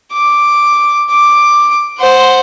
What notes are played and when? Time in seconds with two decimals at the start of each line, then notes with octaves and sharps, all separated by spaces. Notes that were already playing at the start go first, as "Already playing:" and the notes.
0.14 D6
1.11 D6
1.99 C5 F#5